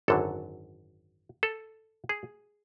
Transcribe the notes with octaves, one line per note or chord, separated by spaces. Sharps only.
G#1 F#2 D3 F#3 A4
A4
G#4